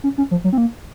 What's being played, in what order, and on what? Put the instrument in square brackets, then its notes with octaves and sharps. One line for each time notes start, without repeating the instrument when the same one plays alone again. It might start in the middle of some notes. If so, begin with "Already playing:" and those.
[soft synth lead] C#4
C#4
F3
F#3
C4
A#3